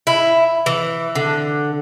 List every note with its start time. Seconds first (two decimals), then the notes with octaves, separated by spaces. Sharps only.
0.07 E4
0.66 E3
1.15 D3